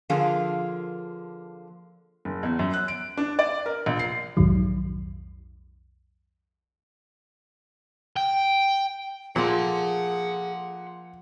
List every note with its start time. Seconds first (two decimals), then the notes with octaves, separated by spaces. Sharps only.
0.10 D3 F3 A#3 F4 G#4
2.25 F#1
2.43 E2
2.59 F#2
2.74 F#6
2.88 D7
3.17 D4
3.39 D5
3.66 A#4
3.86 A#1
3.99 C7
4.37 B1 F2 G#2 D#3 F#3
8.17 G5
9.36 A#2 F3 A#3 F4 G#4 F#5 C6